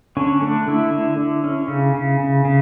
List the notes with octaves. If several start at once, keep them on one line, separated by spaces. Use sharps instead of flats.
D3 C#4
A3 D4
D3 E4
D3
D3
C#4
C#3
C#3
C#3
C#3